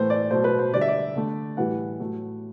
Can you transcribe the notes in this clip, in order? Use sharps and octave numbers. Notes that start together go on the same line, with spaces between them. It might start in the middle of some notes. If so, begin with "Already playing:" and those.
Already playing: A2 E3 A3 C5
D5
B2 F#3 A3 C5
B4
C5
D3 G3 D5
E5
D5
D3 A3
A2 E3 G3 F#5
A2 F#3 A3